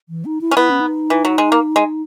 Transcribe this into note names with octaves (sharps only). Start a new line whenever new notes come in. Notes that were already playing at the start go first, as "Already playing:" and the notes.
E3
D#4
E4
C#4
B3 E4
C#4
D#4
E3
F#3
G#3
A#3
G#3